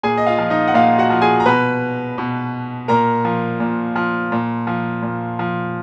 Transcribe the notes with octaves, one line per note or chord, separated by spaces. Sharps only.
A#2 G#4 G#5
D#5
F4 F5
F3
D#4 D#5
F#5
A#2 F4 F5
F#4 F#5
F3
G#4 G#5
A#5
B2 B4 B5
B2
A#2 A#4 A#5
F3
A#2
F3
A#2
F3
A#2
F3